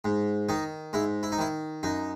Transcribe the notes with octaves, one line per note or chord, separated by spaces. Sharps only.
G#2
D#3 D#4
G#2 E4
E4
D#4
D#3 E4
F#2 D#4